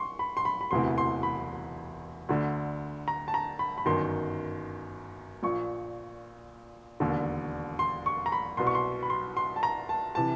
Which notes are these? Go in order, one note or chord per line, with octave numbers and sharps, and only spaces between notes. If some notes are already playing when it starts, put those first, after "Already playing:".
Already playing: C6 C#6
B5
C6
B5
B5
E1 D2 C3 E3 C6
C6
B5
D2 D3
A#5
A5
A#5
B5
B5
G1 F#2 D#3 C6
A#1 A#2 C#6
E1 D#2 D3
C6
C#6
A#5
B5
C2 B2 C6
C#6
C6
B5
C6
C6
A5
A#5
A5
C3 E3 A5